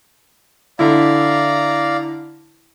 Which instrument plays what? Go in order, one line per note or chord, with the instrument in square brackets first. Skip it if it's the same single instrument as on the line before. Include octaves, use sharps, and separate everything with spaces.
[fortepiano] D3 E4 [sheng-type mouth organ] D5 F5 A#5